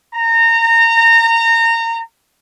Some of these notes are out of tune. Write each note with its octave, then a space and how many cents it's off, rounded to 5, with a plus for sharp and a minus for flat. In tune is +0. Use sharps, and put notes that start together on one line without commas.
A#5 -25